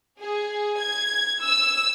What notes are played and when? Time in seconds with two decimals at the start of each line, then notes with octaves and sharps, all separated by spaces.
0.20 G#4
0.79 G#6
1.42 E6